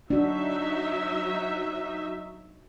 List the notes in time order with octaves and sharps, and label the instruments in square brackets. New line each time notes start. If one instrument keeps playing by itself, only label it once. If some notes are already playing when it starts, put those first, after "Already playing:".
[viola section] F#3 D#4 E5 [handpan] D4 F#4